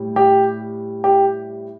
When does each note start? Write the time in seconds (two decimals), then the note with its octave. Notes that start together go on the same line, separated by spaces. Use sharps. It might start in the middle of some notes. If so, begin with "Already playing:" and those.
Already playing: A2 G3
0.16 G4
1.04 G4